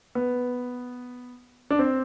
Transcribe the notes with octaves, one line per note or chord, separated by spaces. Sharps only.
B3
D4
C4